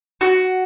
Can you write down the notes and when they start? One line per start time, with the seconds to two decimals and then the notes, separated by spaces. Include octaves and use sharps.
0.21 F#4